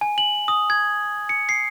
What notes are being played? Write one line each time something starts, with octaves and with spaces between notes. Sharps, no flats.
G#5
F#7
D#6
G#6
C#7
C7